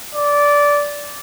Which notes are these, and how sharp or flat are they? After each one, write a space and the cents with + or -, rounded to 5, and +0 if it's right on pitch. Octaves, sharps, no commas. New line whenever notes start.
D5 -15